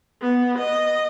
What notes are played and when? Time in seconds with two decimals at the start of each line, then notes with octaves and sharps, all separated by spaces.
0.22 B3
0.58 D#5